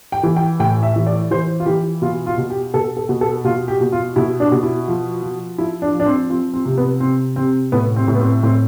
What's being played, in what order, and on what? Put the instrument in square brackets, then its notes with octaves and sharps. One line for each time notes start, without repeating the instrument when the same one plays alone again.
[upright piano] G5
E3
G5
A2 G5
E5
E3
D5
E3 C5
F4
E3 G4
B2 F4
F4
B2
G4
B2 A4
A4
B2
A4
B2 F4
G4
B2
F4
B2 E4
D4
B2
E4
F3
F3
F3 E4
D4
F3
D4
C4
F3 C4
C4
C3
B3
C3 C4
C3 C4
A2 B3
C4
A2
B3
C4
A2 C4